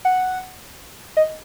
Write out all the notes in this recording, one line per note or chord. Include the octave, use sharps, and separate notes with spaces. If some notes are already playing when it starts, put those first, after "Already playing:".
F#5
D#5